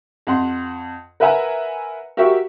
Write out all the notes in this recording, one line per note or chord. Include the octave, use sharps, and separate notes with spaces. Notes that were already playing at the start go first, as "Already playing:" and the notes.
F2 F#5 C6
A#4 B4 E5 F#5 G#5 A#5
F#4 G4 A#4 E5 C#6